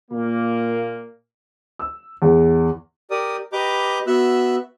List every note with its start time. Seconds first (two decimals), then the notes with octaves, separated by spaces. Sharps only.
0.11 A#2 A#3
1.79 E6
2.22 E2
3.11 G4 A#4 D5 D#6
3.53 G4 B4 D#5 A#5 D6 G6
4.07 B3 F#4 E5 E6 F#6